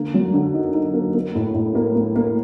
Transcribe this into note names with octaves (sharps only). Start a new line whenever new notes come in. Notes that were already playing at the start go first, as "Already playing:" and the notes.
Already playing: D3 A#3
F#3
D3
D#4
D#4
A#3
A#3
A2
A2
A#3
A#3
A#3